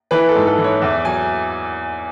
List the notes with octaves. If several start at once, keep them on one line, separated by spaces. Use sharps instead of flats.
E3 B4
A4
G#2
A4
E3
C#5
E2 E5
F#3 G#5